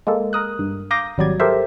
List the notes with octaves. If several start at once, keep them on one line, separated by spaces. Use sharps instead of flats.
G#3 A#3 A4
A#4 D#6 F#6
G2
F5 A#5 D6 D#6 G6 A#6
G#1 F#3 G3 D5 G#6
G4 A4 A#4 C5 E5